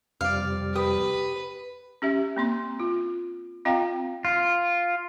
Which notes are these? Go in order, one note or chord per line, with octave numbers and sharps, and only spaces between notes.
F2 C3 G3 D5 F5
G4 B4 D#6
C#4 G4 E5
A#3 C4 C6
F4
C4 F4 D#5 F5 G5 A#5
F4